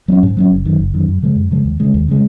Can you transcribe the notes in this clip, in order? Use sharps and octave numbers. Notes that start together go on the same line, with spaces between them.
F#3 A#3 C#4
G#2
F#3 A#3 C#4
F#1
F#2 D#3
F#1
F#2 D#3
F#2
C#3 F3 G#3
F#2
C#3 F3 G#3
D#2
C#3 G#3
D#2
C#3 G#3